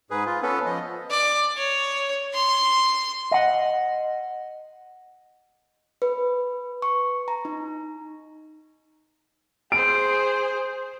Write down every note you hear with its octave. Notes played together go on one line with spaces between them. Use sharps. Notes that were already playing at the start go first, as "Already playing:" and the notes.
G#2 G#4 B4
F4
B3 C#4 A4 B4
F3 D#5
D5
C#5
C6
D#5 F#5
B4
C#6
A#5
D#4
G#4 C5 D7